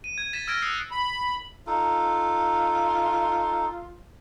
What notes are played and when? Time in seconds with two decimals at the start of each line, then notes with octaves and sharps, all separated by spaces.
0.04 D#7
0.18 G#6
0.33 A6 B6 E7
0.47 E6 F6 G#6 A#6 D7
0.62 D#6 E6 F#6 C7 C#7
0.91 B5
1.67 D#4 F4 A4